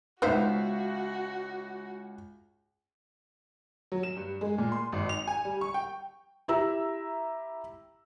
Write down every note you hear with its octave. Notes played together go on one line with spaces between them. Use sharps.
C#2 B3 D#4 F#4 C5 E5 F5
F#3
E7
G2
G#3
A#2
C6
G#1
F7
G#5
G3
C#6
G5
E4 G4 E5 A#5 E6